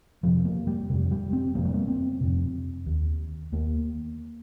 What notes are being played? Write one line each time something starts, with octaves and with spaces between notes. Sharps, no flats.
F2 C3 F3
A#3
G3
F2 C3
G3
C4
F2 C3 A#3
G3
A#3
C4
F2 C3
D#2
D#2 A#3